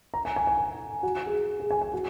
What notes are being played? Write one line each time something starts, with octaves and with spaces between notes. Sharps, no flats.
A#5
G#5
G#5
G#5
F#4
G#4
G#4
G#5
G#5
F#4